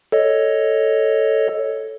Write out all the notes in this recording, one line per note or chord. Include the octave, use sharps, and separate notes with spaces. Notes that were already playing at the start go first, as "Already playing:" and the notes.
A4 C#5 D#5